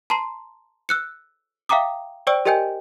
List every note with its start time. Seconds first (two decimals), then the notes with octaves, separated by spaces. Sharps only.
0.10 A5 A#5 C6 C7
0.89 E6 F#6 C#7
1.69 E5 F5 G5 A#5 D6 D#6
2.27 C5 D5 G5 C#6 E6 D7
2.46 G4 A#4 D#5 G5 G#5 G6